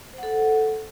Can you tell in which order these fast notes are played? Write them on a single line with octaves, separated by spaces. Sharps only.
C5 F#5 A4